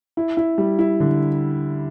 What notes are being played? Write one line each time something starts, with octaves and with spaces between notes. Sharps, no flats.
E4
E4
G3
E4
D3